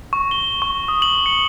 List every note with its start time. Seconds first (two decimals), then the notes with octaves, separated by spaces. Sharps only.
0.13 C#6
0.31 G7
0.62 C#6
0.88 D#6
1.02 F#7
1.26 C#7